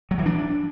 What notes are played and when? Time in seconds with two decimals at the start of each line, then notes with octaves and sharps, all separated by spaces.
0.11 F#3
0.18 E3
0.26 D4